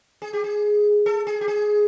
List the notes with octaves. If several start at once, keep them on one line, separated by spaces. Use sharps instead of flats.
G#4
G4
G#4
A4
G#4
G4
G#4